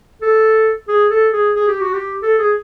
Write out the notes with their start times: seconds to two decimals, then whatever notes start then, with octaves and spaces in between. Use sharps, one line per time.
0.22 A4
0.88 G#4
1.11 A4
1.33 G#4
1.55 G#4
1.68 G4
1.81 F#4
1.93 G4
2.22 A4
2.39 G#4